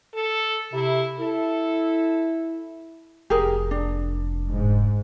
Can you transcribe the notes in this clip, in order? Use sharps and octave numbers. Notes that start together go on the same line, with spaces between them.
A4
C3 E4
E4 A4
F1 G4 G#4 A#4
D4
G#2